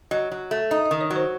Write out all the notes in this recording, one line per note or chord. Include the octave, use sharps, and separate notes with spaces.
F#3 D#5
F#3
A3
D#4 D#5
D#5
D#3
C#5
F#3
C5